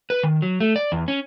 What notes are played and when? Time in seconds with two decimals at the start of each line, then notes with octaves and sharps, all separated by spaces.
0.10 B4
0.23 D#3
0.42 F#3
0.60 A3
0.76 D5
0.92 E2
1.08 C#4